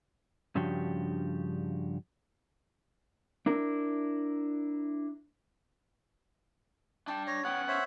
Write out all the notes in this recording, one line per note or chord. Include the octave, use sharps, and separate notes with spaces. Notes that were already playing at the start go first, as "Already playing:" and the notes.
G2 C#3 F3 D4 F#4 G4
D4 E4 A#4
D4 G5 A5
C#5 A#6
B3 C#4 F#5 G5
C5 C#5 E5 E6